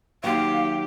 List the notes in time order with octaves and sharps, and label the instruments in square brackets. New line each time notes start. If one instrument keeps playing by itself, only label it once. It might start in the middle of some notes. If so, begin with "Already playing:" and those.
[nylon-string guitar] D#2 F#3 [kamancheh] G4 [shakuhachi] F5